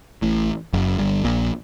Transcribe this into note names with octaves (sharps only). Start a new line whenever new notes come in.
A1 A2
F#1 F#2
G1 G2
A#1 A#2